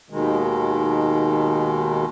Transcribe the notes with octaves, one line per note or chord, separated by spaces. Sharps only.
D#2 B2 D#3 G#3